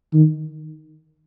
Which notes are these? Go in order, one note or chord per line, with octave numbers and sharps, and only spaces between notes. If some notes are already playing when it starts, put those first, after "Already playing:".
D#3